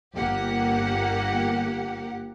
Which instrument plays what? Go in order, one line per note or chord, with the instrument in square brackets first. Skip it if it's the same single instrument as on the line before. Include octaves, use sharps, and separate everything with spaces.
[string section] G1 A#3 G4 F#5